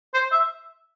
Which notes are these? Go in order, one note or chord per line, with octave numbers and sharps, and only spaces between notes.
C5
E5